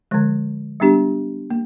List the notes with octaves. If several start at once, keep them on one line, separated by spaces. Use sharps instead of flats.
D3 F3 G#3
G3 B3 D4 G4
A#3